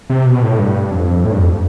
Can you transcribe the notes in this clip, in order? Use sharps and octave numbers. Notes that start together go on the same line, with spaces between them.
C3
B2
A2
G2
F2
A2
G2
F2